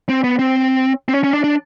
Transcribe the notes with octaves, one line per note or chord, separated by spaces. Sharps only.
C4
B3
C4
C4
C#4
C#4
D4
D4